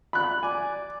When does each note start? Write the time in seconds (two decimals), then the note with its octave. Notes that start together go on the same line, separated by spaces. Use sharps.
0.13 B5 F#6
0.43 D5 G#5